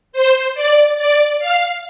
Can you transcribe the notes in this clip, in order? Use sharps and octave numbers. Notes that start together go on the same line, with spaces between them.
C5
D5
D5
F5